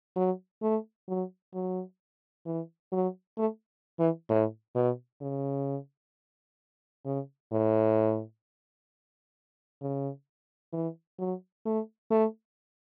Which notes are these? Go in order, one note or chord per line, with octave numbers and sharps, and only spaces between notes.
F#3
A3
F#3
F#3
E3
F#3
A3
E3
A2
B2
C#3
C#3
A2
C#3
E3
F#3
A3
A3